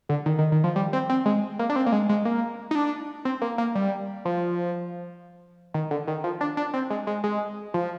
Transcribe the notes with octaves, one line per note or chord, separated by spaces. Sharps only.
D3
D#3
D#3
D#3
F3
G3
C4
C4
G#3
A#3
D4
C4
A#3
G#3
G#3
A#3
D#4
D4
C4
A#3
A#3
G3
F3
D#3
D3
D#3
F3
D4
D4
C4
G#3
G#3
G#3
F3